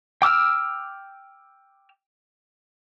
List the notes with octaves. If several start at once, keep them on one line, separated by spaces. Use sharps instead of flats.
G5 D6 E6 F6